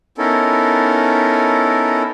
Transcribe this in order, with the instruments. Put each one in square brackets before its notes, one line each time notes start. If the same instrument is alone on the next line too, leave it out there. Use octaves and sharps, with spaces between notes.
[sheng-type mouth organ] B3 C#4 D#4 E4 A4 A#4